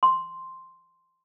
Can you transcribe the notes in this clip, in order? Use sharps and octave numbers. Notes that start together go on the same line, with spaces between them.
C6